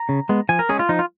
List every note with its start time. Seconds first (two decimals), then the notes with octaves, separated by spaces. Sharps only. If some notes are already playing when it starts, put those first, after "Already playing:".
Already playing: A#5
0.09 C#3
0.29 G#3 B3
0.49 F3 G#5
0.59 A#4
0.69 G#3 C#4 G#4
0.79 F4
0.89 F3 D#4
0.99 F4